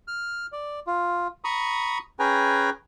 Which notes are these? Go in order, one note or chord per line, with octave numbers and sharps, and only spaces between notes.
F6
D5
F4
A#5 B5 C#6 D#6
C#4 G#4 B4 G5 G#5 A#5